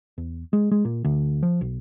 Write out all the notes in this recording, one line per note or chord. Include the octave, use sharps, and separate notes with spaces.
E2
G#3
G#3
A#2
D2
F3
B1